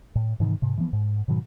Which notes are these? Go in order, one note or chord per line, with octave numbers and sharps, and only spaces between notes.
A2
G#2 C3 D#3 E3
G#2 C3
E3 F3 B3
G#2
G#2 B2 D#3 F#3